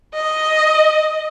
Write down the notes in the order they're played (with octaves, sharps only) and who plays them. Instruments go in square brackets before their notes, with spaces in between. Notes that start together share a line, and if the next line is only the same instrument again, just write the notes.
[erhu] D#5